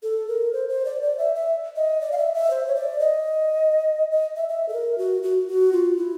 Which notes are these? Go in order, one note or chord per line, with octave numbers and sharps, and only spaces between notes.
A4
A#4
C5
C5
D5
D5
E5
E5
D#5
D5
F5
E5
E5
C5
C#5
D5
D#5
D#5
E5
E5
A4
A#4
F#4
F#4
F#4
F4
E4